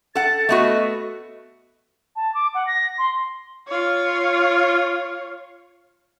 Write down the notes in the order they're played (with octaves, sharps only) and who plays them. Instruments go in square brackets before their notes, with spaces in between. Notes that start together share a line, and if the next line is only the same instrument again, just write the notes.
[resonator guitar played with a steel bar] A4 F#5 [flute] A6
[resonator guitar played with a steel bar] A3 B3 F#4 [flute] D#5
[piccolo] A5
D6
F#5
A#6
C6
[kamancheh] F4 C#5